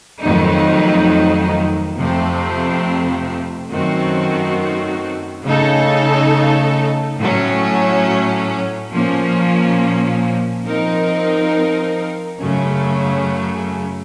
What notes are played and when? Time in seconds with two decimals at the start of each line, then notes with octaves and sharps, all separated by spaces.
0.23 F2 D#3 F#3 A3 D#4
1.97 F2 C3 F3 A3 C4
3.71 F#2 D#3 A3 C4 F#4
5.45 C#3 A3 D#4 A4
7.19 A2 F#3 A3 C#4
8.93 A#2 F3 A#3 C#4
10.67 F3 C4 D#4 A#4
12.41 F#2 C#3 F#3 A3 C#4